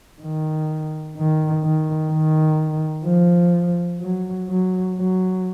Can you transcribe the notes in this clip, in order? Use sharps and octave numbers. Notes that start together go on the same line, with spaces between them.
D#3
D#3
D#3
D#3
F3
F#3
F#3
F#3